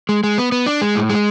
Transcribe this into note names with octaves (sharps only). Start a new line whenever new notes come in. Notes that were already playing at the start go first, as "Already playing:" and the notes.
G#3
G#3
B3
B3
D4
G#3
A2
G#3